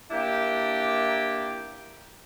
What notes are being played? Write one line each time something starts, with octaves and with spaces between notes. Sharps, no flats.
A#3 D4 E4 G4